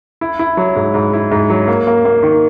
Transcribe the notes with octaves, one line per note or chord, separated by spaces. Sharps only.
E4
E4
F#3
G#2
G#2
E4
G#2
F#3
A#3
A#3
A#3
D#3